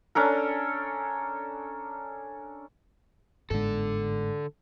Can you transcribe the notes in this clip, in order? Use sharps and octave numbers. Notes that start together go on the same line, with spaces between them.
C#4 D4 A4 A#4
G1 G#2 D3 A4